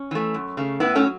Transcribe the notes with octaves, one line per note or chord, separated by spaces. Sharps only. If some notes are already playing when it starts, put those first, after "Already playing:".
Already playing: C#4
E3 A3
F#2
C#3 A3
A2 B3 E4
A3 C#4
F#3